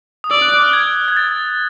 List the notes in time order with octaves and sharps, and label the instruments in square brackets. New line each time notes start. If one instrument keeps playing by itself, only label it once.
[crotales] D#6
[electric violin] D5 [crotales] E6
[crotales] F#6
F#6
F6
G#6
G#6
A6